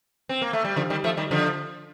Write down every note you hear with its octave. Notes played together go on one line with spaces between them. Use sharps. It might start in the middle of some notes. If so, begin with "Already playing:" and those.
C4
A#3
A3
G3
D3 F3
D#3 G3
F3 A3
D#3 G3
D3 F3